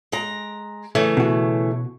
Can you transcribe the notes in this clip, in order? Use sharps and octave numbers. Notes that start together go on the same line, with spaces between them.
G#3 A#5
C#3 E3 A3
B2 F#4